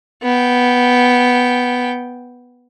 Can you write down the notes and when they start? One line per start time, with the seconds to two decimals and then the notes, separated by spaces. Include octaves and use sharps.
0.23 B3 G5